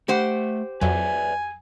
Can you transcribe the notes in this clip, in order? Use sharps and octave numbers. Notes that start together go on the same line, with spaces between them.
A3 G4 C5 F#5
F2 F#3 B4 D5 E5 G#5